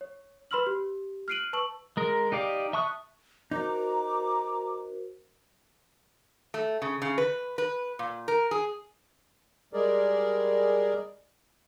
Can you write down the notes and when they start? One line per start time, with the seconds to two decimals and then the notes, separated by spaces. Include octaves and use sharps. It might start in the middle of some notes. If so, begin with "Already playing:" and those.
0.01 C#5
0.51 B4 B5 C6 E6 F6 F#7
0.66 G4
1.28 F6 F#6 C7 D7 D#7 F#7
1.53 B4 A5 C#6 E6 F#7
1.97 G#3 A#4
2.32 D#4 G4 D5 F5
2.73 E5 A5 C#6 D#6 F#6
3.51 D#4 F#4 A#4 C5 A#5 D6
6.54 A3
6.82 C#3
7.02 C#3
7.18 B4
7.58 B4
7.99 A#2
8.28 A#4
8.51 G#4
9.73 G3 G#3 G#4 A#4 D5